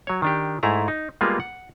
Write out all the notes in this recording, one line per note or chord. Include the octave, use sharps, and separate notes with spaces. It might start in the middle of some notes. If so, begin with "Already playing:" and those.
F#3 C#5
D#3 D4 G4
G#2 A3 E4 G#4 A#5
D#4
G3 G#3 A#3 B3 F4 G#4
F#5